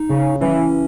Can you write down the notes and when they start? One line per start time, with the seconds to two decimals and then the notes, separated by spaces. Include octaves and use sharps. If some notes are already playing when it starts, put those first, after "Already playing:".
Already playing: D#4
0.10 C#3
0.41 E3 C#4